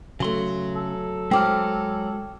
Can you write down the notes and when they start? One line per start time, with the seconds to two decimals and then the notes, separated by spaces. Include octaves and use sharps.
0.20 C#3 F#3 A3 C6
0.76 A4
1.31 F#3 G#3 C4 G5 D6 F6